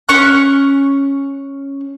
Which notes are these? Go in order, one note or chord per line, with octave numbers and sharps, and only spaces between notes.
C#4 C#6 F#6